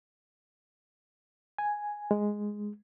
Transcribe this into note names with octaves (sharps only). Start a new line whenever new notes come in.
G#5
G#3